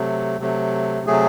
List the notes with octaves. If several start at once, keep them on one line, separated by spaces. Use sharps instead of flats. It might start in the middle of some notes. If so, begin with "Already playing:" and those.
Already playing: C3 F#3 A3
C3 F#3 A3
C3 F#3 A3 G#4